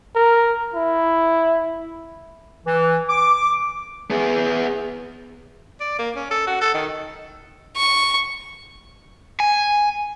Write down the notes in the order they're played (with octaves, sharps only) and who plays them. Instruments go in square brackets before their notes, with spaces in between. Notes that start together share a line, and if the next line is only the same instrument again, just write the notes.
[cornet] A#4
E4
[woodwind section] E3
D6
[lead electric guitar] B3 G#4
[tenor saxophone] D5
A#3
C#4
A4
F#4
A4
D#3
[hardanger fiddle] C#6
[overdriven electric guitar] G#5